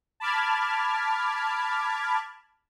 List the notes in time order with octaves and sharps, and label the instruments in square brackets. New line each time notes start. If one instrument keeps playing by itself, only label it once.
[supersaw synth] A5 B5 D6 F6 G#6